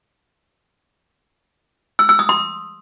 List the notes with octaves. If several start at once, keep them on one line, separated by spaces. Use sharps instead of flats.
E6
E6
D#6
C6